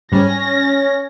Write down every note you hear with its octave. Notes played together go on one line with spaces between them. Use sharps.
G#2 G3 C#4 A#6